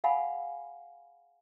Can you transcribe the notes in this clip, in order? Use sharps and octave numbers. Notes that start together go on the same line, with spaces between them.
G#4 F5 F#5 G#5 B5